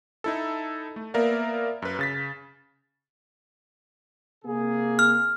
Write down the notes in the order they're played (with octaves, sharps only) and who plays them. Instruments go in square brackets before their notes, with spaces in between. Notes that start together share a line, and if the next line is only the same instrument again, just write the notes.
[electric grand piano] D#4 E4 A4
A3
A#3 B3 A#4 D5 E5 F5
F#2 B4
C#3 A6 B6
[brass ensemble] C3 A#3 G#4
[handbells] F6